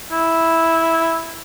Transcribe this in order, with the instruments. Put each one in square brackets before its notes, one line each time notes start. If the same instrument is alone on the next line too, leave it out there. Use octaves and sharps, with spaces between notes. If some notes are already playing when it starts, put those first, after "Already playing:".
[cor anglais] E4